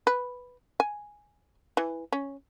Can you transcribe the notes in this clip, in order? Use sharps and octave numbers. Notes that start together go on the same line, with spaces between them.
B4
G#5
E3
C#4